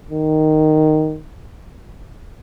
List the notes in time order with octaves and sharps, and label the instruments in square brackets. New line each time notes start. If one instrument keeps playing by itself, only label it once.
[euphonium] D#3